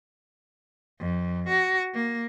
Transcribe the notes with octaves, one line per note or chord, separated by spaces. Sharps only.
F2
F#4
A#3